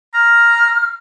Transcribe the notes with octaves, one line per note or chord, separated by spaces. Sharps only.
A#5 F6